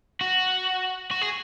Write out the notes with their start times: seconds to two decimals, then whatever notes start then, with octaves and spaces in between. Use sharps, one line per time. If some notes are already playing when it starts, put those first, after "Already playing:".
0.21 F#4
1.11 F#4
1.21 G#4